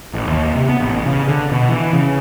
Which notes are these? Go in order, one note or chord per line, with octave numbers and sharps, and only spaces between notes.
A1
D#2
C3
B3
A1
C#3
D3
B2
E3
C#3